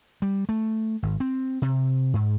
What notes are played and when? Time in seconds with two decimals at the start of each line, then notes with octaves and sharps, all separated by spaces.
0.22 G3
0.49 A3
1.03 G#1
1.20 C4
1.62 C3
2.14 G#2